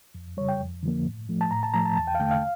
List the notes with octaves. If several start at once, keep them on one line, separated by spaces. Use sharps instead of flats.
F2
C#3 G3 C#5
G5
F2
D3 F3 A#3
A2
F3 A3
A5
A2 A#5
A5
F3 A3 A#5
A5
E2 A5
G5
F5
D3 A3 G5
F5